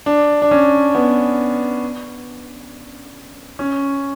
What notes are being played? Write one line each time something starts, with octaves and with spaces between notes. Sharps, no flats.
D4
D4
C#4
B3
C#4